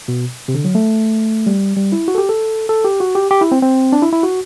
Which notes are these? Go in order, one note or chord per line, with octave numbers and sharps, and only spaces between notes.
B2
C3
D3
F#3
A3
G3
G3
E4
F#4
A4
G4
A4
A4
G4
F#4
G4
G4
E4
C4
C4
D4
E4
E4
F#4